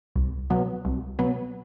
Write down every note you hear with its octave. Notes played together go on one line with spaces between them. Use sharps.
C2
B2 F#3 B3
C2
B2 F#3 B3